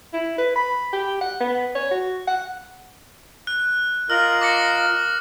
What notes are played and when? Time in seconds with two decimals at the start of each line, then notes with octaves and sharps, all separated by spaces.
0.13 E4
0.38 B4
0.56 B5
0.93 G4
1.21 F#5
1.40 B3
1.75 C#5
1.91 F#4
2.28 F#5
3.47 F#6
4.10 F4 A#4 D#5 F6 F#7
4.41 D6 A#6 C#7